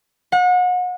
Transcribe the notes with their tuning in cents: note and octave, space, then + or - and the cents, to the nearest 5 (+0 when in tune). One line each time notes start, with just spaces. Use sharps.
F#5 -35